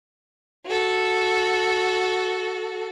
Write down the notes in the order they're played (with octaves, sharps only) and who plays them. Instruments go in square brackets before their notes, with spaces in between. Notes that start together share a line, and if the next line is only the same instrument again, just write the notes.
[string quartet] F#4 A4